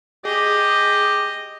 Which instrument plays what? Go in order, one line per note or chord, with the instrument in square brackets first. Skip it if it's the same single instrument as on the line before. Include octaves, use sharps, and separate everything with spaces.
[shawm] G4 [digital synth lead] G#4 [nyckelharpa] D#5